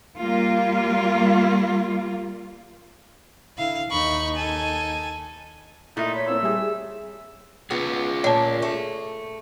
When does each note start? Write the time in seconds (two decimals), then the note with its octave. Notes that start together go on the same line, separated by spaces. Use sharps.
0.18 G3 A#3 F4
3.58 D3 E4 F5
3.91 D#2 D#4 B5 C#6
4.35 A4 G#5
5.97 A#2 A3 D#4 E4
6.15 C#5 B5
6.27 A#3 C4 E4 E6
6.43 G3 G#4 E5
7.71 B3 F4 G#4
8.24 A#2 C#5 A5
8.62 A3